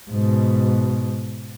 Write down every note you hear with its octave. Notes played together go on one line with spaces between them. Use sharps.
G#2 B2